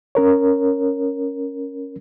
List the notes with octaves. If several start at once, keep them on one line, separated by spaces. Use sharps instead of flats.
C#4 A#4 C#5